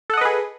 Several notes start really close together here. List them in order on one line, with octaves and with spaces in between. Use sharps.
A4 F#5 D#5 B4 G#4